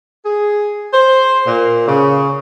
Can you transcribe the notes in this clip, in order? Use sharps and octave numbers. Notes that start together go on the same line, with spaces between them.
G#4
C5
A#2
C#3